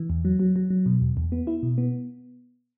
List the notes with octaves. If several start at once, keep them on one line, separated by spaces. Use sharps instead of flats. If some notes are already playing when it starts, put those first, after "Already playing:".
Already playing: E3
E2
F#3
F#3
F#3
F#3
B2
E2
E2
B3
E4
B2
B3